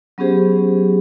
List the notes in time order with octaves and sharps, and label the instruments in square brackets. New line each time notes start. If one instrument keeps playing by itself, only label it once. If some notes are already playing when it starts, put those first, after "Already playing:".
[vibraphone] F#3 B3 C#4 G4 G#4 C5